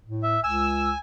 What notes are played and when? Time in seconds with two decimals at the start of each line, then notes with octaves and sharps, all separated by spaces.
0.06 A2
0.23 E5
0.44 C#2 G#5 E6